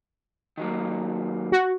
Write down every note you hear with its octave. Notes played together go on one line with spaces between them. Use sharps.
D#3 F#3 A#3
F#4